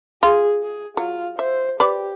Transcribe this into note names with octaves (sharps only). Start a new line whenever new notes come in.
F4 G#4
G#4
F#3 F4
C5 E5
G4 B4 D5